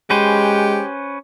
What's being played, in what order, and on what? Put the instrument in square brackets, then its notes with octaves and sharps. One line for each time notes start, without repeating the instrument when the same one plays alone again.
[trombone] G#3 [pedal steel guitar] C#4 B4 C5 [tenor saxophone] G4